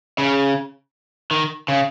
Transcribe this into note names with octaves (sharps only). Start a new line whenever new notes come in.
C#3
D#3
C#3